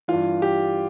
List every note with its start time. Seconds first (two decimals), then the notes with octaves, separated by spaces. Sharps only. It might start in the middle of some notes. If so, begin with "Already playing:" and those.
0.08 G2 E3 F4
0.42 G4